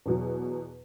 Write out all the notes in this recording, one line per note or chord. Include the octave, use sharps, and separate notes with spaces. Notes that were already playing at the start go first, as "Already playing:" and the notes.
E2 B2 F#3